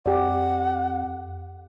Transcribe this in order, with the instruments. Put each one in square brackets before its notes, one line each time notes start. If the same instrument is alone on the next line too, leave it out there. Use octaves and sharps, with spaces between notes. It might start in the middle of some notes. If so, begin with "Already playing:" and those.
[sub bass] F2 [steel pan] G4 D5 [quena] F#5